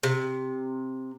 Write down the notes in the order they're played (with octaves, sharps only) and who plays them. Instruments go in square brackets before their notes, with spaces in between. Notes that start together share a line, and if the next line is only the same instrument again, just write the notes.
[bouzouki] C3